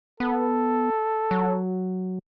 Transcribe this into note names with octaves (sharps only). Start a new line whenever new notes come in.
B3 A4
F#3